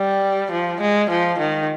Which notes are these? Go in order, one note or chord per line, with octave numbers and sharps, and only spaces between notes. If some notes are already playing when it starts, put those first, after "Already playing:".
Already playing: G3
F3
G#3
F3
D#3